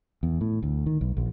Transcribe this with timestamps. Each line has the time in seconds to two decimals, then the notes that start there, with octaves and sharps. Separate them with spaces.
0.23 E2
0.41 A2
0.63 D2
0.86 D#3
1.01 B1
1.17 A#1